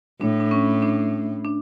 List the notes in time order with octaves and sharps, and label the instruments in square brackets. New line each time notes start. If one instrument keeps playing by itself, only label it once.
[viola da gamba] A2 [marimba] D4
[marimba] D4
C#4
D4
D4